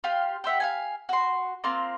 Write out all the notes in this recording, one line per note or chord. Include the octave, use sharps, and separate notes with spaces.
F4 G4 F5
G4 C5 E5 F#5
F5 F#5 G#5
F#4 C6
A#3 C4 F4